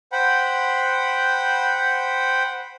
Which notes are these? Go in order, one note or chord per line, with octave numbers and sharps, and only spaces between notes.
C5 F#5 G5 B5